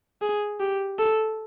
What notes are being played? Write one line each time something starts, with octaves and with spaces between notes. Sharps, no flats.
G#4
G4
A4